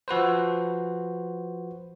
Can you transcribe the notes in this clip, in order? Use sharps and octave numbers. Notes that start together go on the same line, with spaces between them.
F3 F#4 B4 C5